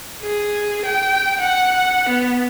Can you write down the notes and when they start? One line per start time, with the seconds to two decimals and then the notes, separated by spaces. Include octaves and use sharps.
0.23 G#4
0.86 G5
1.41 F#5
2.09 B3